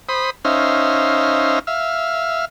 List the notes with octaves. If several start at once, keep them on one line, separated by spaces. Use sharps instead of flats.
C5 B5 D#6
C#4 D#4 C5 E5 F5
E5 F5